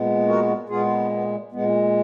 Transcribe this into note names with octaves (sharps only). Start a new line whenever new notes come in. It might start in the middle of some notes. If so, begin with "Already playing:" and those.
Already playing: A#2 G#3 B3
F#4 A#4
A#2 G#3 B3 F4 G#4
B3
A#2 G#3 B3